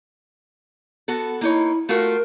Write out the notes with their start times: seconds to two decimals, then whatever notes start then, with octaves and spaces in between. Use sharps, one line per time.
1.08 B3 F#4 A4
1.41 A#3 D#4 E4 C#5
1.89 A3 F4 F#4 A#4